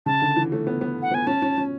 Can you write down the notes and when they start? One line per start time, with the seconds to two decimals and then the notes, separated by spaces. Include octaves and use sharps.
0.06 C#3 A5
0.22 D3
0.36 E3
0.52 A3
0.67 B3
0.81 B3
1.02 F#5
1.11 B3 G#5
1.27 C#4 A5
1.42 C#4
1.58 C#4